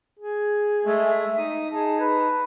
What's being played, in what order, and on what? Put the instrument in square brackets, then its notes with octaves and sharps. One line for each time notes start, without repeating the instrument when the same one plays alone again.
[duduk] G#4
[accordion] G#3 A3 [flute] E5
[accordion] D#4 D#6
[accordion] D#4 [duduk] G#4 [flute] A5
[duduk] B4